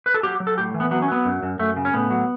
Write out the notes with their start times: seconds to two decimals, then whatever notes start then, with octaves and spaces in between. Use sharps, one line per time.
0.06 B4
0.14 A4
0.23 F#3 G4
0.40 F#3
0.47 A4
0.58 A2 G4
0.74 E3
0.80 B3
0.91 F#3 B3
1.02 C#4
1.08 F#3 B3
1.25 F#2
1.43 F#2
1.59 F#2 A3
1.76 C#3
1.85 C#4
1.94 A2 B3
2.10 F#3